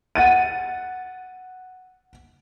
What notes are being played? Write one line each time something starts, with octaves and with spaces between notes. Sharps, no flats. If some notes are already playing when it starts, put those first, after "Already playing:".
F#5 A6 D#7